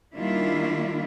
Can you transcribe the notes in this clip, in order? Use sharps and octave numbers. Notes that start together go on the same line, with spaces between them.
D#3 G3 A#3 D4 E4 F4